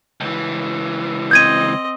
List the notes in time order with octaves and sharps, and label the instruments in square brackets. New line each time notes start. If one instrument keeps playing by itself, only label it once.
[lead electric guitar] C#2 E3
[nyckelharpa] C4 D#5 [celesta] G6 G#6 D#7